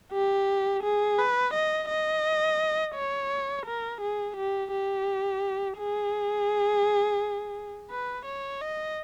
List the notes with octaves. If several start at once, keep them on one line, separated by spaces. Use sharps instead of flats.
G4
G#4
B4
D#5
D#5
C#5
A#4
G#4
G4
G4
G#4
B4
C#5
D#5